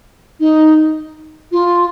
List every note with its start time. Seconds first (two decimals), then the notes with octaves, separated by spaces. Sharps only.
0.40 D#4
1.52 F4